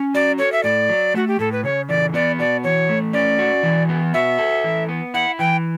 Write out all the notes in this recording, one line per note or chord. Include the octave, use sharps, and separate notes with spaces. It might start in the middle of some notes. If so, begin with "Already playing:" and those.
Already playing: C#4
F#4 D5
A4 C#5
E5
A2 D5
F#3
A3 F#4
G4
A2 A4
B4
C#3 C#5
E3 D5
B3 D5
F#4 D5
E3 C#5
A3
C#4 D5
F#4
E3
B3
F#4 E5
A4
E3
B3
E4 F#5
E3 G5